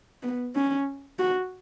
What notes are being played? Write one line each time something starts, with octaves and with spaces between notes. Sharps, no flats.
B3
C#4
F#4